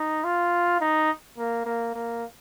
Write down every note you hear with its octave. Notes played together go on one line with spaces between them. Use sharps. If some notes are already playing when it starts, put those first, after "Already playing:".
Already playing: D#4
F4
D#4
A#3
A#3
A#3